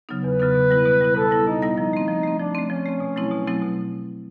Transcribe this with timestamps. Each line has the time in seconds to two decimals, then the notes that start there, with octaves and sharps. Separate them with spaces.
0.09 C#3 F#3 B3 D#4
0.24 E2 B4
0.40 C#3 F#3 B3 D#4
0.55 B2
0.71 G3 B3 E4
0.85 B2
1.01 G3 B3 E4
1.16 B2 A4
1.31 G3 B3 E4
1.47 B2 D#4
1.62 G3 B3 E4
1.78 F3 D#4
1.93 A3 C4
2.08 F3
2.24 A3 C4
2.39 F3 D4
2.55 A3 C4
2.70 F3 C#4
2.86 A3 C4
3.00 B2
3.16 F#3 A3 C4 E4
3.31 B2
3.47 F#3 A3 C4 E4
3.62 B2